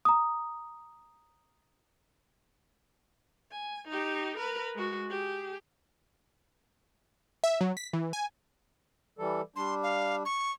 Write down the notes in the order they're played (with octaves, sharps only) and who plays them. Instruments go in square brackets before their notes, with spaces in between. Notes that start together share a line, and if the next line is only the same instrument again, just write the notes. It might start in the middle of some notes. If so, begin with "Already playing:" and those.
[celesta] A#5 D#6
[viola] G#5
D#4 G4
A#4 B4
G#3 F#4
G4 G#4
[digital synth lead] E5
F#3
B6
E3
G#5
[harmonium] E3 G3 A4
[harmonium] G3 D4 [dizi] C6
[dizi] F5
C#6